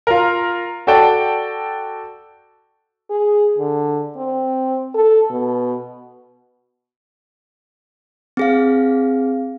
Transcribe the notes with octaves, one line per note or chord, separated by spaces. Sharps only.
F4 A#4
F#4 A4 D5 G5 A5
G#4
D3
C4
A4
B2
C4 G#4 F5